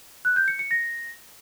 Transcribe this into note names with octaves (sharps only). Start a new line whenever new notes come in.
F#6
G6
C#7
C#7
A#6